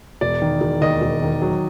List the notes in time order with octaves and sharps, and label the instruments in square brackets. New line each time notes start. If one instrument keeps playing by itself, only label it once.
[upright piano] E1 [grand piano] D5
[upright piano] D#3
E1
[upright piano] D#2 [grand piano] D#5
[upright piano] E1
D#3
F#3